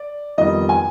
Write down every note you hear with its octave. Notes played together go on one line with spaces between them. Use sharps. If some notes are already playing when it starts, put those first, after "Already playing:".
Already playing: D5
F2 D#3 G3 B3 D#5
G#5